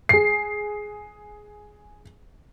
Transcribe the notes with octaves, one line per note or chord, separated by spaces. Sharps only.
G#4 C7